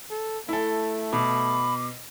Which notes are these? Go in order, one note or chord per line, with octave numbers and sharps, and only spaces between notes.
A4
A3 E4 A4
B2 B5 D6